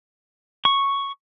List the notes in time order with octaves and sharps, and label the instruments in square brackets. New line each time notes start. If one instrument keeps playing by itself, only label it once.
[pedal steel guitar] C#6